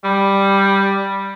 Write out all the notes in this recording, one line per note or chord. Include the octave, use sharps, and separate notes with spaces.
G3